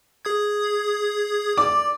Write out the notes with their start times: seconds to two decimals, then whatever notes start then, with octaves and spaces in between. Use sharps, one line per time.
0.25 G#4 D#6 G#6
1.57 D5 D6